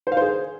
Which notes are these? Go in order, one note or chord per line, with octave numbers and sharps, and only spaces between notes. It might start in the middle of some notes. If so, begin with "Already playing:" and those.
C5
F5
C5
G#4